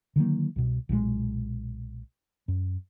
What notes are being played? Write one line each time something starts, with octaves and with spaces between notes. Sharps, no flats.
D3 D#3 F#3 A#3
C2 B2
B1 A#2 C#3 G#3
F#2